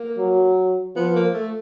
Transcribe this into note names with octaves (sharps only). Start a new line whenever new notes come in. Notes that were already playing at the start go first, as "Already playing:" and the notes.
Already playing: A#3
F#3
F3 B3
A#3
A3